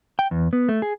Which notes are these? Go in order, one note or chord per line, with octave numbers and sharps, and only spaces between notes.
G5
E2
B3
A3
G#4